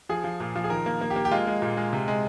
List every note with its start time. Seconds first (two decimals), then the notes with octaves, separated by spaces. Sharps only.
0.09 F3 G#4
0.24 F3
0.40 A#2
0.56 F3
0.64 G#4
0.70 D#3 A#4
0.86 A#3
1.01 A#3
1.10 G4
1.16 A#3
1.25 G4
1.31 G#3 F4
1.47 G#3
1.62 A#2
1.77 G#3
1.93 C3
2.08 G#3